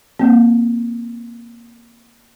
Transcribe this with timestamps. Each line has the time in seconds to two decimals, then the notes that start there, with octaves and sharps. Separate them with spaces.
0.19 A#3 C4